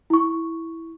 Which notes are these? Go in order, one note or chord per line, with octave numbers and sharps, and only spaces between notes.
E4 C#6